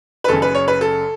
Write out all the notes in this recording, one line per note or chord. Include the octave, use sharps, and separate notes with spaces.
B4
F#1 F#2 C#3 A4
B4
C#5
B4
A4